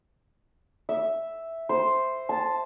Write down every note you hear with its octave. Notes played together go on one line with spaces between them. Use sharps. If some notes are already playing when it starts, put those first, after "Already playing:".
E5
C5
A5